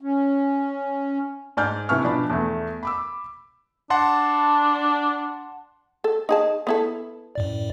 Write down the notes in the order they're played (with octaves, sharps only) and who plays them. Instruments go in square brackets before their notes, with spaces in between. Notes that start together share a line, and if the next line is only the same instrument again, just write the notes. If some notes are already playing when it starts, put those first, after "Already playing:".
[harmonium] C#4
[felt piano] G#2 D5 G#5 F6 G6
C3 B3 E4 G#5 C#6 F6
B2 F3 D4 D5 B5
E2 A3
B5 D6 E6
[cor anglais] D4 [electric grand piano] F#5 A5 C6
[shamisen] A4
D#4 G#4 A5
B3 E4 A4
[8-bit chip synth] F#2 A2 D5